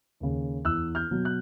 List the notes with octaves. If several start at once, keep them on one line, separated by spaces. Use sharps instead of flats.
D#2 C#3
E2 E6 F#6
F6 G6
B2 F#3
F#6